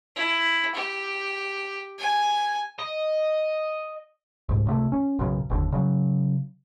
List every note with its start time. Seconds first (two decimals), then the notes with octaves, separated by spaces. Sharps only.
0.16 E4
0.75 G4
1.99 G#5
2.79 D#5
4.49 C2 G#2
4.65 C#2 C3 D#3 A3
4.92 C#4
5.19 B1 F#2 C#3
5.50 F#1 D#2 D3
5.72 C#3 F#3